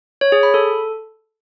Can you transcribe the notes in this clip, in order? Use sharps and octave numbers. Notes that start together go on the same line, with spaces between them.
C#5
G#4
B5
A4